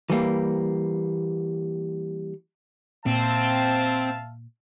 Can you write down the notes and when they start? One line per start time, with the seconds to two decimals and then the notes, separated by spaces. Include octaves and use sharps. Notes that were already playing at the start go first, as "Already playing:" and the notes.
0.10 E3 G3 A#3
3.06 A#2 C4 E5 F5 A5